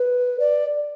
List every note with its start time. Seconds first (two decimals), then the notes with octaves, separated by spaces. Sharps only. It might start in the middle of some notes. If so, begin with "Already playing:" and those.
Already playing: B4
0.39 D5